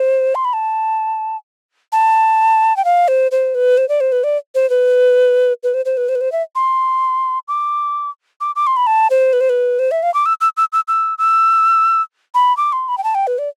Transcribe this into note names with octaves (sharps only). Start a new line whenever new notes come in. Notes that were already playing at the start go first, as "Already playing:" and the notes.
Already playing: C5
C6
B5
A5
A5
G5
F5
C5
C5
B4
C5
D5
C5
B4
D5
C5
B4
B4
C5
C5
B4
C5
B4
C5
E5
C6
D6
D6
D6
C6
B5
A5
C5
B4
C5
B4
C5
E5
F5
D6
E6
E6
E6
E6
E6
E6
B5
D6
C6
B5
G5
A5
G5
B4
D5